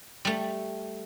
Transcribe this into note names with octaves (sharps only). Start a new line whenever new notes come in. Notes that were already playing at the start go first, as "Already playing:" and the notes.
G3 A3